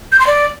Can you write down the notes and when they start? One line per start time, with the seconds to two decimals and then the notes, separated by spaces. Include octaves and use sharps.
0.12 G6
0.19 C6
0.27 D5